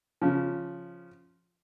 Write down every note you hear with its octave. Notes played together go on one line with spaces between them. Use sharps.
C#3 F3